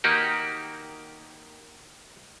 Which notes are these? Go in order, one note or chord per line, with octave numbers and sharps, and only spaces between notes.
D#3 A#3 D#4 F#4 G4